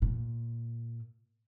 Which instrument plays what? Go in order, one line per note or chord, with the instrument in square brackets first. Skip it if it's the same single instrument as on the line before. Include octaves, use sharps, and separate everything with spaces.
[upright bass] A#2